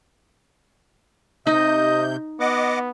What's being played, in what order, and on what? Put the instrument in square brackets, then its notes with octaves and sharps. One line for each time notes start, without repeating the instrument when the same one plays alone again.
[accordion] C3 G6 [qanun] D#4 [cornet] D#5
[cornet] B3 [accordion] D#5 F#5 D6